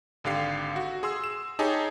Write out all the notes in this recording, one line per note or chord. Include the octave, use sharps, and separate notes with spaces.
G#1 D3 G4 F5 C7
F#4
G#4 C6 E6
E7
D#4 G4 G#4 C#5 G#5 A5